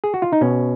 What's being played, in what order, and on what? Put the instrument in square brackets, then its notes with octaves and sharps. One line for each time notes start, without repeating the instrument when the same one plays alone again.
[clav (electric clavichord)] G#4
F#4
F4
D#4
B2 C#4